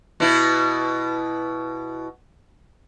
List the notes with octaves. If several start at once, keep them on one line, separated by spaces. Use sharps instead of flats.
B2 E4